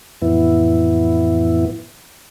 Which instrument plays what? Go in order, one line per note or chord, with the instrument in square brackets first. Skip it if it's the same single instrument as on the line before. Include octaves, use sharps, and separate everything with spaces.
[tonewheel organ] F2 A2 E3 B3 E4